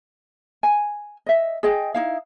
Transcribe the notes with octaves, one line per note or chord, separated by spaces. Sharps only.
G#5
D#5 E5
G#4 D#5 G5
D#4 E4 F5